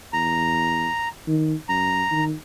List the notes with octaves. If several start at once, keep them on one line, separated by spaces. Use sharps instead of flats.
E2 A#5
D#3
F#2 A#5
D#3